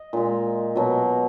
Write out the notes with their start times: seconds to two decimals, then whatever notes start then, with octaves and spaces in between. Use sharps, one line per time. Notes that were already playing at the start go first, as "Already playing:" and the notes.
Already playing: D#5
0.13 A#2 G#3
0.75 B2 F#3